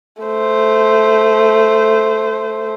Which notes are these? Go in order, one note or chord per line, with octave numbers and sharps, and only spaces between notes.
A3 C5